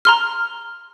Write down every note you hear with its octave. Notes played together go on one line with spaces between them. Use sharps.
A#5 C6 F6